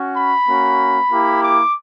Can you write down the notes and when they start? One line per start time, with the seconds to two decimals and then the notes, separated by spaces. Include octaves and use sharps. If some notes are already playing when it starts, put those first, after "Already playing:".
Already playing: C#4 F#4
0.16 B5
0.48 A#3 C#4 F#4
1.11 A#3 E4 G4
1.42 D6